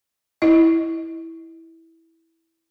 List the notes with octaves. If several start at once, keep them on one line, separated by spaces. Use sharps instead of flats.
E4 D#5